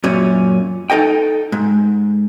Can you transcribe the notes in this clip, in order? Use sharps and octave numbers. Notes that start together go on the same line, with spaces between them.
F#2 A#2 C#4
D#4 A4 D#5 G5
G#2